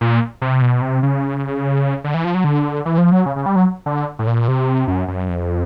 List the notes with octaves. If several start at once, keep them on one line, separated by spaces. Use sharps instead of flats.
A#2
C3
B2
C3
C#3
D3
E3
F3
F#3
D3
E3
F3
F#3
C#3
C#3
G3
F#3
D3
A2
A#2
C3
F#2
F#2
F2